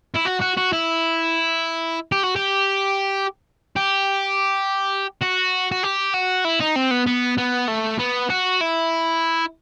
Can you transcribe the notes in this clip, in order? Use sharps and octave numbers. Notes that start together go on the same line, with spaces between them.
E4
F#4
F#4
F#4
E4
G4
F#4
G4
G4
F#4
F#4
G4
F#4
E4
D#4
C4
B3
B3
B3
A3
B3
F#4
E4